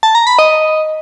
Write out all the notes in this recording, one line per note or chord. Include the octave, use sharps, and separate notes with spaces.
A5
A#5
B5
D#5